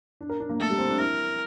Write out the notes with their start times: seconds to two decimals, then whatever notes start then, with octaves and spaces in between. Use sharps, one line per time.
0.21 D4
0.30 A#4
0.40 D4
0.50 A#3
0.60 A3 A4
0.70 G3
0.79 C4
0.89 D4
0.99 E4 A#4